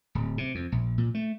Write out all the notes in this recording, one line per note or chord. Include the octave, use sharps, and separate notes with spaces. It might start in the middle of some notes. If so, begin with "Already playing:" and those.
D1
C3
F2
A#1
A#2
A3